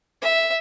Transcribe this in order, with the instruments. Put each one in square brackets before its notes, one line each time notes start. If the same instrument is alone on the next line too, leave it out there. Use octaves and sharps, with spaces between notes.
[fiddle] E5